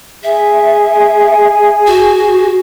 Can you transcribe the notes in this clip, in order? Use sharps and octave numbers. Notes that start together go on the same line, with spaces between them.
G#4 E5
F#4